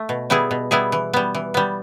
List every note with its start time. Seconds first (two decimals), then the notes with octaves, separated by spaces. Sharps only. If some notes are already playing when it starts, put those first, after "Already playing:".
Already playing: A3
0.09 B2
0.30 G3 B3 E4 G#4
0.51 B2
0.71 G3 B3 E4 G#4
0.92 E3
1.14 G3 B3
1.35 E3
1.54 G3 B3